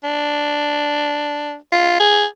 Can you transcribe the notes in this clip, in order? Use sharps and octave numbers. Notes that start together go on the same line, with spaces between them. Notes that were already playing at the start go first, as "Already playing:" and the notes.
D4
F4
G#4